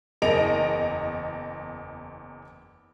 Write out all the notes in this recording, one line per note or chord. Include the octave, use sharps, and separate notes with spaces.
F#1 E2 A#4 D#5 D7 F7